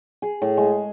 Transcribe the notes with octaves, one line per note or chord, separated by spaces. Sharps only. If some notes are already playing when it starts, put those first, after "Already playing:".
G#4
A2
G#3